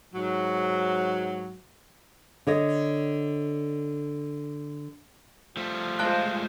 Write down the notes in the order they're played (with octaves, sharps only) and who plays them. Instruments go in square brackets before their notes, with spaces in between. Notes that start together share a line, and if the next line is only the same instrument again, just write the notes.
[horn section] G#2 F#3
[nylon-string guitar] D3 C#5 D#5
[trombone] F3 [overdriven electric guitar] G3 A3
[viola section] G#3 F4 C5 [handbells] F5 A5 F#6